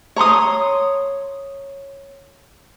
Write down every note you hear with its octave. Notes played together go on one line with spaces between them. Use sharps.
C#5 A#5 C6 D#6